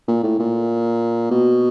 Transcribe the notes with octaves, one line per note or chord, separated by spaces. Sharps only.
A#2
A2
A#2
B2